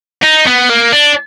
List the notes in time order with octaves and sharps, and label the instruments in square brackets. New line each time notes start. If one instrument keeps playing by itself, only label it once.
[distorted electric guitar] D#4
B3
A#3
D4